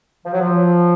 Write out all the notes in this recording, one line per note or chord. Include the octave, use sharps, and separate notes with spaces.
F3
F#3
F3